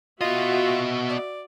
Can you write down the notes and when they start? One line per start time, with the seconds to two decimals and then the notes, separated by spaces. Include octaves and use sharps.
0.21 B3 F4 F#4 D#5 E5
1.10 D5